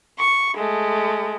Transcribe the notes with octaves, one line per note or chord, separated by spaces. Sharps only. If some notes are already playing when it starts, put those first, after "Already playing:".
C#6
G#3 A3